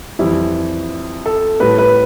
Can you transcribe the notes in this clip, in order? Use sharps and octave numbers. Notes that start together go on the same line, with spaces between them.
F2 E3 G3 E4
A4
A2 G3 B4
B4